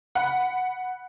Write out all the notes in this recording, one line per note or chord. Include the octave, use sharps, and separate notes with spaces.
F#5 B5